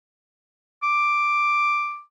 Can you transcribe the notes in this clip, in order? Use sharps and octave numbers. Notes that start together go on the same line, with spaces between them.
D6